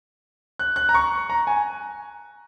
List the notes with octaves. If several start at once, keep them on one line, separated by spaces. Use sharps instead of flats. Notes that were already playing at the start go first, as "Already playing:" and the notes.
F#6
F#6
A#5
C#6
A#5
G#5